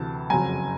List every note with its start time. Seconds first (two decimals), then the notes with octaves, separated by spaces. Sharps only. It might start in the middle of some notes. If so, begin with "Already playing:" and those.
Already playing: D2 C3 E3 A5
0.30 F#1 F2 C#3 F#3 G#5 A#5